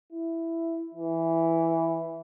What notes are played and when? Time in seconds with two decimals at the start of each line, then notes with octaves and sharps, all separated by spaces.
0.12 E4
0.95 E3